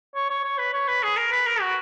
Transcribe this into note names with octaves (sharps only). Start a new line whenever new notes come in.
C#5
C#5
C#5
B4
C#5
B4
G#4
A#4
B4
A#4
F#4